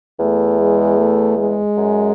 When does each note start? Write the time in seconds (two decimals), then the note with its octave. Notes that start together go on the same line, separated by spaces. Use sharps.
0.19 E2 A3
0.59 G#3
0.98 A3
1.37 G#3
1.77 F#2